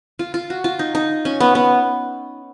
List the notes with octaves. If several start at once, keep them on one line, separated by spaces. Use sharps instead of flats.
F4
F4
F#4
F4
D#4
D#4
C#4
B3
B3